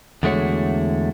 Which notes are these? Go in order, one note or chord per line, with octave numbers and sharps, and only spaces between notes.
E2 D3 G#3 A3 F#4 C#5